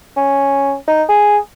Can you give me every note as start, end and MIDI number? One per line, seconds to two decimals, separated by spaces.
0.16 0.74 61
0.87 1.03 63
1.08 1.37 68